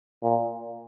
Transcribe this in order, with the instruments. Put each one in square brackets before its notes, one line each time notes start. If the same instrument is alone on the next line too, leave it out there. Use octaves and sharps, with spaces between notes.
[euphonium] A#2